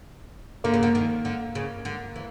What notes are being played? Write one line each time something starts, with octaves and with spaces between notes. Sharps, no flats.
D3 A#3
C#3
D3
D#3
D3
C#3
D3
E3